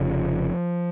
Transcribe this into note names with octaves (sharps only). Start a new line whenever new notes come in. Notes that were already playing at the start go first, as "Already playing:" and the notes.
Already playing: F1 F2 C#3 F3